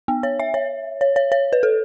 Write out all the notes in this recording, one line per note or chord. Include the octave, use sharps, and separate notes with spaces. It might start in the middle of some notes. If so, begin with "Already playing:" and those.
B3
C#5
E5
C#5
C#5
C#5
C#5
B4
A4